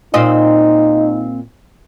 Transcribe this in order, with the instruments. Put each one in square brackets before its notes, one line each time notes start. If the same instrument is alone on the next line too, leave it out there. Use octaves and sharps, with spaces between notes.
[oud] A#2 C4 D#5 [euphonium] D#4